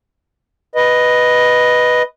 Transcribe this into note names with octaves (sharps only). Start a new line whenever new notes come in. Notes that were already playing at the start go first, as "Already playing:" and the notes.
B4 D#5